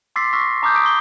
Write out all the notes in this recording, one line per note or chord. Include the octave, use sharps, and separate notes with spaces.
C6 D6 E6 A6 B6 C7
C#6 E6 F6 A#6 B6
A5 A#5 D6 D#6 F6 G6
C#6 D#6 B6 D7
G7